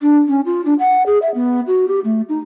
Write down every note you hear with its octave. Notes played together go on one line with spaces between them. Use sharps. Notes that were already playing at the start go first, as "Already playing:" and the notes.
D4
C#4
F4
D4
F#5
G#4
E5
B3
F#4
G4
A3
D#4